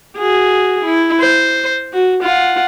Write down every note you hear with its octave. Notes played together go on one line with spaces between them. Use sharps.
F#4 G#4
E4
C5
F#4
F4 F#5